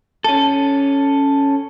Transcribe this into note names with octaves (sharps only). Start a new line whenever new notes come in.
C#4 A4